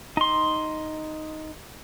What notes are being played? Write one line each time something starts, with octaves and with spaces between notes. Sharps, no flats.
D#4 C6